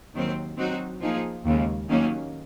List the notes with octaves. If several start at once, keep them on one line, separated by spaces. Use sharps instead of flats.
D#2 D#3 F#3 C4
F#3 C4 D#4 F#4
F3 A#3 D#4 G#4
D#2 C#3 G#3
D#2 D#3 F#3 A#3 C#4